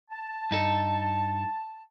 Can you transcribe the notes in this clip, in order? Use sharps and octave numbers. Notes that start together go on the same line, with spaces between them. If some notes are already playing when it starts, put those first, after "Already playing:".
A5
G2 D#4 A4